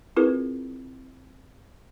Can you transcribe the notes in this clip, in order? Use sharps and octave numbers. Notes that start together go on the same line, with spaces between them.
C4 E4 F4 G#4 A#4 B4